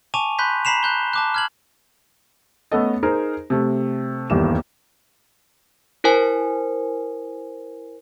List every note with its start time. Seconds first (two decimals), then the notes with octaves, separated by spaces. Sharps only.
0.14 G#5 A5 C#6 D6 D#7 F7
0.39 B5 C6 F#6 G6 B6
0.65 A#5 B5 B6 C7 E7 F7
0.83 F#6 G6 G7
1.13 A5 D6 F#6
1.34 F6 G#6 F#7
2.72 A3 B3 C#4 A4 D#5
3.03 D#4 G#4 A#4 C5
3.50 C3 A3
4.30 D#1 E2 G2 D#3 E3 E7
6.04 E4 A#4 C5 G#5